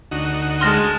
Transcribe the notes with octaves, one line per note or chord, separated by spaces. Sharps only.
D2 D#4 F#4
G#3 A5 C6 F6 A#6